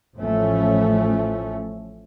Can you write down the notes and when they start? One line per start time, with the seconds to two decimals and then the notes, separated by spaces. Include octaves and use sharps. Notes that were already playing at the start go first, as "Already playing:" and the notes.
0.16 A1 A2 F3 A3 C#4